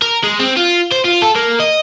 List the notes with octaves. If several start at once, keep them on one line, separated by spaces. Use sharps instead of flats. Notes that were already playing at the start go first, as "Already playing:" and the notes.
A#4
G#3
C4
F4
C5
F4
A4
A#3
D#5